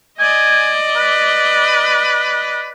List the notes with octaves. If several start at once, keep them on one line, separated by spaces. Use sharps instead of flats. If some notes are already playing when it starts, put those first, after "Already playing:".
D5 D#5 G#5
B4